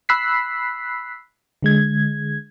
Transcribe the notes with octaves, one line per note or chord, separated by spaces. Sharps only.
B5 E6 F#6 B6 C7
D3 G#3 G#6